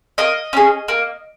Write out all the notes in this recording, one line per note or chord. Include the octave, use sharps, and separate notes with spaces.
A#3 D#5
C#4 G#4
A#3